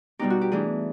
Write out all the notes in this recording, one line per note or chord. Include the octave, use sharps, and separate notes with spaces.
B2 G3 B3 D#4 G4
F#4
G4
E3 A3 D4 G#4